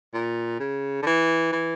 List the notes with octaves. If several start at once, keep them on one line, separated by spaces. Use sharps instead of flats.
A#2
C#3
D3
E3
E3